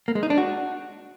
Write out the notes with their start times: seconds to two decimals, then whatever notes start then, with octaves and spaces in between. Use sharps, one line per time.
0.08 A#3
0.15 G#3
0.23 D#4
0.30 D4
0.38 F#4